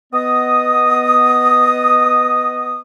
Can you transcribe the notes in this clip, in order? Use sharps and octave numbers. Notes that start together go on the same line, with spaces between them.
B3 D#5 D#6